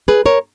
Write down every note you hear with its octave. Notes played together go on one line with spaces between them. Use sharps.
G#4 B4
A#4 C#5